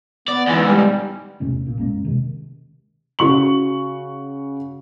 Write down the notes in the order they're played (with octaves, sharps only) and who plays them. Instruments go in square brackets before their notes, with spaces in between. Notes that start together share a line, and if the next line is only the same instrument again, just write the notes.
[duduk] B3 [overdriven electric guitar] D5
[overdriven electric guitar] E2 G#2 [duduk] E3
[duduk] G3
[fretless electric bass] E2 C3 A3 C#4
A#1 A#2
F2 G#3 A#3 C#4
C3 D#3 G#3 C#4
[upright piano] C#3 F#4 C#6 F#7